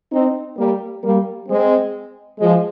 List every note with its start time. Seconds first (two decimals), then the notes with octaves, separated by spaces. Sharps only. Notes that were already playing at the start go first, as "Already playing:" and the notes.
0.12 C4 D#4
0.58 G3 A#3
1.04 G3 A#3
1.49 G#3 C4
2.40 F3 G#3